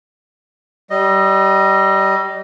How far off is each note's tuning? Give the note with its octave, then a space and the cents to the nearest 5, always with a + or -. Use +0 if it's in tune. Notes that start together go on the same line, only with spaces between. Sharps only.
G3 -25 D#5 +0